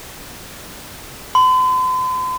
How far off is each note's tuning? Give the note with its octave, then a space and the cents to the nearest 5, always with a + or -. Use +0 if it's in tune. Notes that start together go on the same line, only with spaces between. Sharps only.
C6 -45